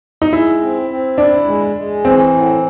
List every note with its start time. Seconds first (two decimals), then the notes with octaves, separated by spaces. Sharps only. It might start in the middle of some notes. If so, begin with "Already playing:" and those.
0.22 D#4
0.33 G#3 E4
0.61 C4
0.90 C4
1.18 D4 E4
1.46 G#3
1.76 G#3
2.05 E3 C4
2.33 A2